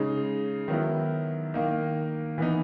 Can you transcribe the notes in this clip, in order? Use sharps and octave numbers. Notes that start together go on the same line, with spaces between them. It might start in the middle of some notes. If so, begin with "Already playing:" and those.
Already playing: C#3 G#3 D#4
D#3 F#3 B3 E4
D#3 A#3 D#4
E3 B3 D#4